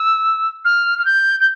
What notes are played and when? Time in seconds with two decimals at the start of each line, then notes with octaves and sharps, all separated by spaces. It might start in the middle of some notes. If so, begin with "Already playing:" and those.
Already playing: E6
0.65 F6
0.98 F6
1.05 G6
1.40 G6